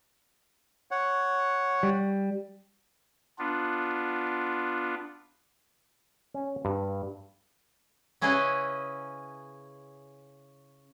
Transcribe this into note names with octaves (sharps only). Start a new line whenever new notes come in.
C#5 F#5
G3
B3 D4 F4
C#4
G2
C#3 C#4 E4 G#4 B4 D#5